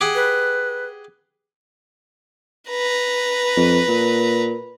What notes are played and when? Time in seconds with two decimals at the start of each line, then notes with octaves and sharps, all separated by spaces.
0.01 G4 G#4 F#5
0.15 B4
2.69 B4 A#5
3.57 F2
3.88 A#2